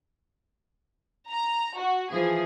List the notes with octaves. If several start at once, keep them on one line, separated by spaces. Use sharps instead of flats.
A#5
F#4
E3 F3 G#4